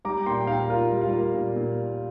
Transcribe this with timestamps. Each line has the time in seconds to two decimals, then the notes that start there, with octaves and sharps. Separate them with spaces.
0.05 G3 A#5 D6
0.26 A#2 G5 C6
0.41 G5
0.47 A#2 F5 A#5
0.70 A#3 F4 A#4
0.92 G3
1.02 F4
1.13 A#3
1.34 A#2
1.56 A#2
1.78 A#3